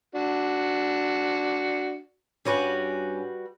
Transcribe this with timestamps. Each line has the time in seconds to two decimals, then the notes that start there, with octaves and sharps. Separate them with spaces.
0.15 D4 F#4
2.45 G2 G3 C#4 F#4 B4 G#5